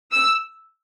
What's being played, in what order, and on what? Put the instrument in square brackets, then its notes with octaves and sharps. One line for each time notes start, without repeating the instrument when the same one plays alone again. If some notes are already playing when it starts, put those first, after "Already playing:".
[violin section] E6